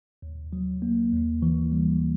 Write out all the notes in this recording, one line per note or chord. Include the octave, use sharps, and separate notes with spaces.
D#2
F#3
A#3
D#2
E3
G3